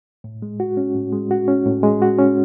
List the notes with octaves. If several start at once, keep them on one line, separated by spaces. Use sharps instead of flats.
A2
G#3
F#4
C#4
A2
G#3
F#4
C#4
A2
G#3
F#4
C#4